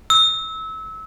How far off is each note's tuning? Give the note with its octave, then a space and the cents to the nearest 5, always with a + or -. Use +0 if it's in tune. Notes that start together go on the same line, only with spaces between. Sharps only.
E6 -25